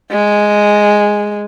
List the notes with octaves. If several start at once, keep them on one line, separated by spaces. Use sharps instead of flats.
G#3